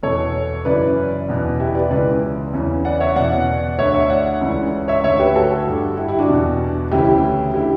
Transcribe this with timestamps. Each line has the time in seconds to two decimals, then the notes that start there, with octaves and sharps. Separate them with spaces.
0.03 E2 B2 A4 C#5
0.65 F#2 C#3 E3 B4 D5
1.29 E2 B2
1.60 E4 G4
1.75 B4 D5
1.91 C#2 C#3 E3 B4 D5
2.54 E2 C#3 E3
2.85 D5 F#5
3.00 C#5 E5
3.16 E2 B2 D5 F#5
3.78 D2 D3 C#5 E5
3.94 C#5 E5
4.10 D5 F#5
4.41 C#2 C#3 E3
4.88 C#5 E5
5.03 D2 D3 C#5 E5
5.19 G4 B4
5.35 F#4 A4
5.67 G2 D3
5.97 E4 G4
6.08 E4 G4
6.19 D4 F#4
6.29 E2 B2
6.92 D2 C#3 E3 E4 G4
7.54 D3 E4 G4